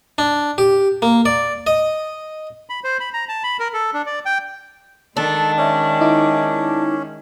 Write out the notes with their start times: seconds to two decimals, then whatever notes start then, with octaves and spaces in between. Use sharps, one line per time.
0.18 D4
0.58 G4
1.02 A#3
1.26 D5
1.67 D#5
2.70 B5
2.84 C5
3.00 B5
3.13 A#5
3.29 A5
3.43 B5
3.60 A#4
3.74 A4
3.94 D4
4.06 D5
4.26 G5
5.17 D#3 G#3 D4 A4
5.58 C#4 D5 E5
6.01 D#4 E4 D6